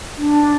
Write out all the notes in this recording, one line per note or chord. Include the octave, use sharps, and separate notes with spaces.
D4